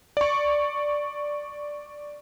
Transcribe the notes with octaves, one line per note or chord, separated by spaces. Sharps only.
D5 C#6